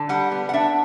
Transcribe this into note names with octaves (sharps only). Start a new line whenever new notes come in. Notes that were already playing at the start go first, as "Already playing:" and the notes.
Already playing: D3
G3 F#5
B3
F#5
D4 E5